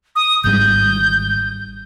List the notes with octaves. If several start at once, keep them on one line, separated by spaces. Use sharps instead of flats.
D#6
G#1 G#2 G3 G6